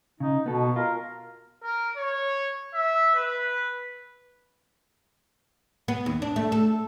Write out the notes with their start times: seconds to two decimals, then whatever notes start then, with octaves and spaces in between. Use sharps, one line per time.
0.20 C#3 D#4
0.46 B2 B3 A4
0.76 F4 A#4
1.63 A#4
1.97 C#5
2.74 E5
3.15 B4
5.88 B3
6.06 D#2
6.22 D4
6.36 A3
6.52 A4